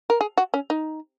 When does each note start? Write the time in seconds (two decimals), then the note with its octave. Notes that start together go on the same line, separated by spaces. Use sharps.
0.10 A#4
0.21 G#4
0.38 F#4
0.54 C#4
0.70 D#4